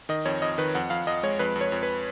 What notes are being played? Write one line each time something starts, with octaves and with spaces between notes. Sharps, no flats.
D#3 D#5
F2 C#5
F2 D#5
D#3 B4
F2 F#5
F2 F5
F2 D#5
G#3 C#5
F2 B4
F2
C#5
F2
B4